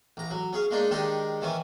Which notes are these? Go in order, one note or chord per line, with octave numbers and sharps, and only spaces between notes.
A1 A#5
F#3
C#4 G#4 F5
G#3 A#3 D4 D#4
D#3 G#3 D4 D#4 G4 A#4
D#3 E3 C#4 G#5